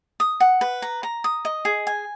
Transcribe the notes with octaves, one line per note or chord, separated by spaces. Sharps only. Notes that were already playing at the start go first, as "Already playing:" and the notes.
D#6
F#5
B4
A#5
A#5
D#6
D#5
G#4
G#5